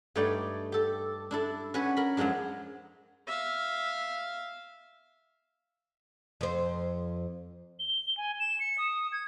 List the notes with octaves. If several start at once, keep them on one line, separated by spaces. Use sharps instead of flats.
G2 A3 D#4 C#5 D5 G5
G4 A4
D4 E4 A4
C#4 F#4 B4 C#5
A#4 B5
F#2 F3 F#3 G#3 D4
E5 F5
F2 C5
G7
G#5
E7
C#7
D#6
G#6